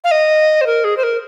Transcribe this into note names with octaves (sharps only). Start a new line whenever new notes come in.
F5
D#5
C5
A#4
G#4
C5
A#4